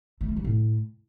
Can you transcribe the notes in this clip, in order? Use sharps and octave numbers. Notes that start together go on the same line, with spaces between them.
A3
E3
G3
A2